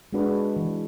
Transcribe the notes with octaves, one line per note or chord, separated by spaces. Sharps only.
G#3 D4 F#4 B4
E3